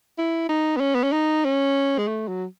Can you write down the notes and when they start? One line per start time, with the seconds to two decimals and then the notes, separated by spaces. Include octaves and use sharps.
0.18 E4
0.49 D#4
0.77 B3
0.80 C#4
0.95 B3
1.04 C#4
1.12 D#4
1.45 C#4
1.98 G#3
2.07 A3
2.28 F#3